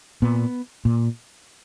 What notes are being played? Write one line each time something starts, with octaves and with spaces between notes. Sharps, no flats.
A#2 B3
A#2